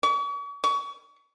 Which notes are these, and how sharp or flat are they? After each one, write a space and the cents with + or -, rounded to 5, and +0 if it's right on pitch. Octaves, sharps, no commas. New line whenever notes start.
C#6 +40
C#6 +30